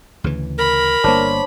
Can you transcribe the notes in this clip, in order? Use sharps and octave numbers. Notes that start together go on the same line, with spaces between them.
D2 C#3 E3
A#4 B5
G1 C#3 A#3 D4 C5 C#5